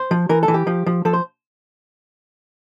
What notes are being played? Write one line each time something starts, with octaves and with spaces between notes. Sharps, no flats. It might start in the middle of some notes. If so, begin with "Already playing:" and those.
Already playing: C5
F3
E3 A#4
A4
E3
G4
F3
F3
F3 A4
C5